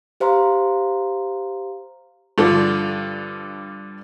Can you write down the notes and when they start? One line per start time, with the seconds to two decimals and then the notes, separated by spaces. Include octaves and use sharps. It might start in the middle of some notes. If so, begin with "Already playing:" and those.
0.20 G4 C5 F5 A#5 C6
2.38 G2 D3 F3